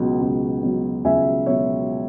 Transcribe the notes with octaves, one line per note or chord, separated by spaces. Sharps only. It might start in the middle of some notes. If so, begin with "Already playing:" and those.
Already playing: C#2 B2 F#3
C#2
B2 F#3
C#2 E5 G#5
B2 F#3 C#5 E5